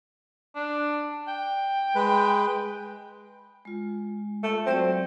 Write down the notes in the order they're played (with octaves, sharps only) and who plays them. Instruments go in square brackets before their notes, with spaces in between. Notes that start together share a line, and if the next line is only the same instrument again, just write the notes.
[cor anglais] D4
G5
[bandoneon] G#3 B4
[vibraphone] G#3 F4
[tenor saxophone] A3
[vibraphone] F#3 F#4 D5 [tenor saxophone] C4